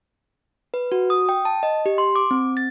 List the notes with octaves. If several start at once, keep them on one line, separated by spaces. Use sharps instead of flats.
B4
F#4
D#6
G5
A5
D#5
G4
C6
D6
C4
A6